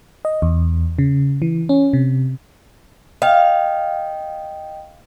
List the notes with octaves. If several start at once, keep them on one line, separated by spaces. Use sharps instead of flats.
D#5
E2
C#3
E3
C#4
C3
D#5 F5 G5